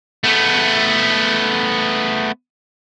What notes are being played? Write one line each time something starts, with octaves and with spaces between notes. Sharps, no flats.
A3 B3